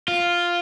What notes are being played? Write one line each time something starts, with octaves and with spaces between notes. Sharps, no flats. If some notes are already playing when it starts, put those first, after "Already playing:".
F4